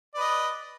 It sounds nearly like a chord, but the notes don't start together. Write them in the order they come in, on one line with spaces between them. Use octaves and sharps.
D5 B4 D#5